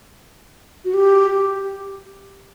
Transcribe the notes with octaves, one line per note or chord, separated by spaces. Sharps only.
F#4
G4